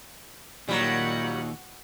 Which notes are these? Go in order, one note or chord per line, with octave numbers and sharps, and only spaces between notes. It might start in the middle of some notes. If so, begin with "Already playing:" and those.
D#2 A#2 F#3 G3 F#4 F#5